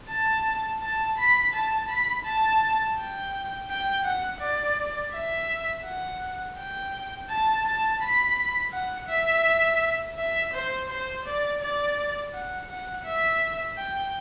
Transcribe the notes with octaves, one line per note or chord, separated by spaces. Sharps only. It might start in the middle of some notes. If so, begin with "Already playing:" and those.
A5
A5
B5
A5
B5
A5
G5
G5
F#5
D5
E5
F#5
G5
A5
A5
B5
F#5
E5
E5
C5
C5
D5
D5
F#5
F#5
E5
G5